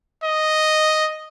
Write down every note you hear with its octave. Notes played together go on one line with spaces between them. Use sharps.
D#5